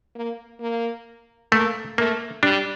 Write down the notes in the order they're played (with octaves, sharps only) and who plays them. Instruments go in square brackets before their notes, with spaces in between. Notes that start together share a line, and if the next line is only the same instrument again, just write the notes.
[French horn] A#3
A#3
[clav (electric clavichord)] A3 [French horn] A#3
[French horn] A3 [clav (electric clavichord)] A#3
[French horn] G3 [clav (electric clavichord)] D4